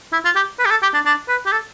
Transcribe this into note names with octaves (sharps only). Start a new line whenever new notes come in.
E4
F4
G4
B4
G4
A4
G4
D4
D4
B4
G4
A4